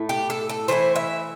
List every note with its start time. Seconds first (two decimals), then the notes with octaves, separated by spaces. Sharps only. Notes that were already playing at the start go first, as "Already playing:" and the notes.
Already playing: A2 A3 E4
0.09 G4
0.30 A4
0.49 A4
0.68 E3 A3 E4 C5
0.96 E5